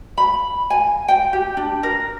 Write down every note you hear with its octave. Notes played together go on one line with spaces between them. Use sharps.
B5
G#5
G5
G4
D4
A#4